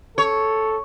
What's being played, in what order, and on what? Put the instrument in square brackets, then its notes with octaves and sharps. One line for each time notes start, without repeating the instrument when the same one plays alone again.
[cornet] A4 [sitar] C#5